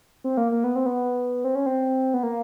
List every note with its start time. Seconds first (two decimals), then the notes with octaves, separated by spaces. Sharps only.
0.24 C4
0.37 A#3
0.52 A#3
0.64 B3
0.76 C4
0.86 B3
1.44 C4
1.55 C#4
1.66 C4
2.14 B3
2.23 A#3